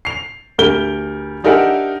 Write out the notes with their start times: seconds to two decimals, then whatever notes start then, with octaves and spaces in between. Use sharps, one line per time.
0.05 C7 F7
0.58 D2 G4 A#4 G6 G7
1.44 D4 D#4 G4 A#4 E5 F#5